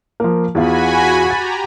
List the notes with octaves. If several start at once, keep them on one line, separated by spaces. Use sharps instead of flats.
F3 A#3
E2 F4 F#4 G#5 B5
G4 A#5 A6